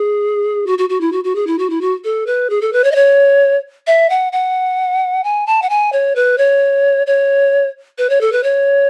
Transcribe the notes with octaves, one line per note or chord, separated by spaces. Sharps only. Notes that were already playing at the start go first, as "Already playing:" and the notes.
Already playing: G#4
F#4
F#4
F#4
E4
F#4
F#4
G#4
E4
F#4
E4
F#4
A4
B4
G#4
A4
B4
C#5
D#5
C#5
E5
F#5
F#5
G#5
A5
F#5
G#5
C#5
B4
C#5
C#5
B4
C#5
A4
B4
C#5